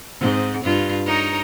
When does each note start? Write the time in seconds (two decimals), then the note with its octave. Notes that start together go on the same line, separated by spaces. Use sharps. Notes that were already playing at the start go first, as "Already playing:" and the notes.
0.20 G#2 C4
0.64 G2 F4
1.06 D#4 A#4 C#5